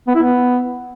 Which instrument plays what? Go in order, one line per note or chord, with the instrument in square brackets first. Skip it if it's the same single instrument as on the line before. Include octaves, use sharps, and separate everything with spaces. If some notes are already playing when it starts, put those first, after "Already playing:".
[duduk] B3
E4
B3